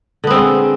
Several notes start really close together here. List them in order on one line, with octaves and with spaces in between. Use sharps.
D3 B3 C4 G#3